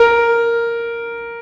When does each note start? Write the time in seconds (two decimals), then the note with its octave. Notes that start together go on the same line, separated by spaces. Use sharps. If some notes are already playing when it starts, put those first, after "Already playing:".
Already playing: A#4